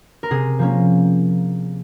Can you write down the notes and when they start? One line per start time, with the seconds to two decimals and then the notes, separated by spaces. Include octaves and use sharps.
0.23 A#4
0.30 C3 G#4
0.59 F3 A#3 C#4